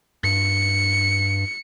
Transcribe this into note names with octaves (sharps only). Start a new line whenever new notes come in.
G2 C#7